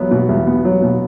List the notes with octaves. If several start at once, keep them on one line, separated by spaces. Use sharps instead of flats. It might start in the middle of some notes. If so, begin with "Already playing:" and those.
Already playing: E2 F#3 B3
B2
E2
B3
F#3
B2